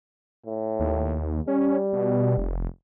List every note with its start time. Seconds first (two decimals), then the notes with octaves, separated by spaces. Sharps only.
0.46 A2
0.80 D#2
1.47 G3 C#4
1.93 B2
2.37 F1